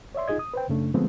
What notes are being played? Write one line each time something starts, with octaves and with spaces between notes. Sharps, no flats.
C#5 D5 E5 C6
D#4 F4 G#4 D#5 G#6
D#6
B4 C5 G5
F#2 C#3 A3 D4
D3 F3 G#3 A3 B3 C4